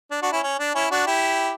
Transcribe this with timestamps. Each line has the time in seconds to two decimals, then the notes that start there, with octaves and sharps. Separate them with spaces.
0.11 D4
0.22 D4 F#4
0.32 C#4 E4
0.43 C#4
0.59 D4
0.75 C#4 E4
0.91 D4 F#4
1.07 E4 G4